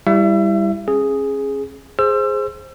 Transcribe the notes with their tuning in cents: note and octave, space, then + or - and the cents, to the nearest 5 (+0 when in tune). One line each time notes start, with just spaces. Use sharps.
G3 +10 E4 +0 E5 +35
C#4 -35 G#4 +0
G#4 +0 C5 +10 E6 +35